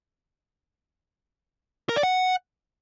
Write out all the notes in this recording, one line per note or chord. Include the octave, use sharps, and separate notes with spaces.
A#4
D5
F#5